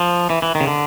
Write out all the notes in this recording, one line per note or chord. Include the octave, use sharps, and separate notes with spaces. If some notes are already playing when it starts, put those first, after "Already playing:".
Already playing: F3
E3
E3
D#3
C#3
D3